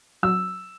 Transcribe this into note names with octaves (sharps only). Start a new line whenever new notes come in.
F#3 E6